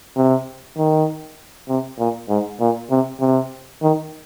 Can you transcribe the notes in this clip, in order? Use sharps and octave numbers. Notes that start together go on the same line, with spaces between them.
C3
D#3
C3
A#2
G#2
A#2
C3
C3
D#3